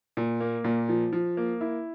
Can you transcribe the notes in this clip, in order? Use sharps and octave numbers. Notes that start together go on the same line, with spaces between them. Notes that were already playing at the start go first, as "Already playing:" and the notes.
A#2
A#3
A#2
F3
F3
A#3
E4